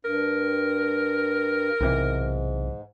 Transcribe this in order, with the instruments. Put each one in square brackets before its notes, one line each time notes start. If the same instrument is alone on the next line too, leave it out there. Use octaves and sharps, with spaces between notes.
[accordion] G2 [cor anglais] A#4
[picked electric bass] B1 C3 E3 [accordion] G#2